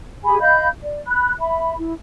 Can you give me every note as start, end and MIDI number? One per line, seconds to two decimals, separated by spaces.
0.24 0.38 67
0.24 0.38 68
0.24 0.38 80
0.24 0.38 83
0.40 0.67 75
0.40 0.67 77
0.40 0.67 83
0.40 0.67 91
0.84 1.01 74
1.07 1.33 83
1.07 1.33 90
1.39 1.75 76
1.39 1.75 83
1.78 1.94 64